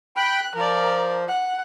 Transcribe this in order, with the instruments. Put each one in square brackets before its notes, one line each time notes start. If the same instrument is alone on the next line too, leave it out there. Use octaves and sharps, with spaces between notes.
[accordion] G5 B5 [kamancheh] F#6
[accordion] F3 [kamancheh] A#4 D5
[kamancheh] F#5